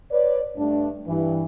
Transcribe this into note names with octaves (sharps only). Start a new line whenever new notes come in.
B4 C#5 D5
G2 A3 D4
G2 E3